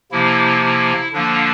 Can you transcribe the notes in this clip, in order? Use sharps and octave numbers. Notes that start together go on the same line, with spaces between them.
C3 F3 A#3 E4
E4
D3 F3 A#3 D4